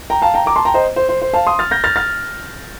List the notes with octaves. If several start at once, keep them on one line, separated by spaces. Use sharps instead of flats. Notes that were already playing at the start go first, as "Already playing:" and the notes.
G5 A#5
F5 A5
G5 A#5
A#5 D6
A5 C6
G5 A#5
C5 D#5
C5
C5
C5
F5 A5
C6 D#6
F6 A6
G6 A#6
F6 A6
F6 A6